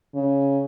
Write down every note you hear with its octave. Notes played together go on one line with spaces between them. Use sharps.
C#3